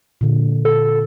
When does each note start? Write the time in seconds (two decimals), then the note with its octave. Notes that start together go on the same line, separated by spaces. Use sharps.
0.21 A#2 D3
0.65 A4